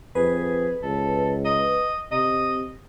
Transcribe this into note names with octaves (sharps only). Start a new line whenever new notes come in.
F2 G#4 B4
C#2 A4
D#5
C3 D#5